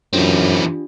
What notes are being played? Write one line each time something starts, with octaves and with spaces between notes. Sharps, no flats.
F#2 E3 C4 D4 F4 G4